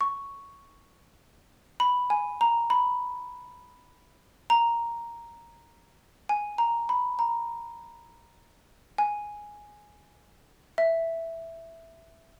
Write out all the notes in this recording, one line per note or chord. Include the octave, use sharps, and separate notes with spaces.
C#6
B5
G#5
A#5
B5
A#5
G#5
A#5
B5
A#5
G#5
E5